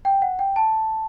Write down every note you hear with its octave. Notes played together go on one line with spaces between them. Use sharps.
G5
F#5
G5
A5